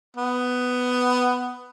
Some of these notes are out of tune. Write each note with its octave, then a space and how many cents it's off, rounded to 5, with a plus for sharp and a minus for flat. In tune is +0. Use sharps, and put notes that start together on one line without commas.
B3 +10